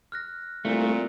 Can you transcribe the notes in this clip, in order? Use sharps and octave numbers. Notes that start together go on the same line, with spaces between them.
F6 F#6 A#6
C2 A#2 A3